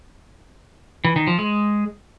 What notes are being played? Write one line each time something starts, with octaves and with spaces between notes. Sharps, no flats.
E3
D#3
F3
G#3